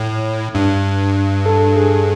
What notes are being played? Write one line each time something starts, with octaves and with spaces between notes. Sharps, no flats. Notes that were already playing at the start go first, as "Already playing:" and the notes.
Already playing: A2
G2
A4
G#4